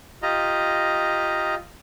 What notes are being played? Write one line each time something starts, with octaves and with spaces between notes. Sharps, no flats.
F4 G4 D#5 A#5